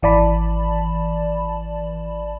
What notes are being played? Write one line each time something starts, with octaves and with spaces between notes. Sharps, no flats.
G#1 E3 D5 A5 B5